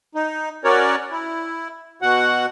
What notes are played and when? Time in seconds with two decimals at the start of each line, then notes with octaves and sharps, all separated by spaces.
0.15 D#4
0.64 C#4 F#4 A#4 C#5 D5
1.11 E4
2.02 B2 F#4 F#5